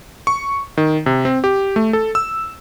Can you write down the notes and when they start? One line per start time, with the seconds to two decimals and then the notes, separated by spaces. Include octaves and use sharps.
0.27 C#6
0.77 D#3
1.06 C3
1.25 C4
1.44 G4
1.76 A3
1.93 A4
2.15 E6